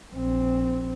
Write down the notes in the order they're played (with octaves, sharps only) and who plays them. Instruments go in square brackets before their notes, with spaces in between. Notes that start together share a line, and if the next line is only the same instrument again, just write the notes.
[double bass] A#1 C4